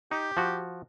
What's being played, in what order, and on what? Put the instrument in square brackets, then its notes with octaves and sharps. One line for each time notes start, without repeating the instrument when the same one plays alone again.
[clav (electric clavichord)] D#4 [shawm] G4
[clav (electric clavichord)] F3 F#4